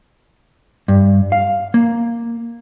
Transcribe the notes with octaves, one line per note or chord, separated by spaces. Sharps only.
G2
F5
A#3